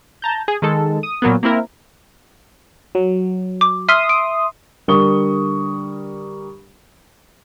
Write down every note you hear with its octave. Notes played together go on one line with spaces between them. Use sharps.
A5 A#5 G6
G#4
D#3 G#3 A4
D#6
A#2 F#3 A#3 B3
A#3 C4 E4 A#4
F#3
D6
E5 C6 D#6 F6 B6 G7
D7
D3 G3 A#4 C#6 D#6 G7